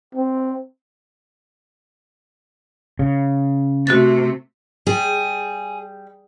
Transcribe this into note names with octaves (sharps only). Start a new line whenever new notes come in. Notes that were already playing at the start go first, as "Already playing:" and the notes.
C4
C#3
C3 A3 F#4 F#6 A6
G3 G#4